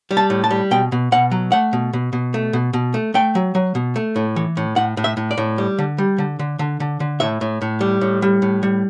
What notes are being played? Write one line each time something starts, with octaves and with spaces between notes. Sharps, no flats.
G3
A5
A2
A5
G3
B2 G5
B2
B2 F#5
F#3
A3 F#5
B2
B2
B2
A3
B2
B2
A3
A3 G5
F#3
F#3
B2
A3
A2
E3
A2
A2 F#5
A2
E5
A2
D5
A2
G3
D3
G3
D3
D3
D3
D3
D3
A2 E5
A2
A2
G3
A2
G3
A2
G3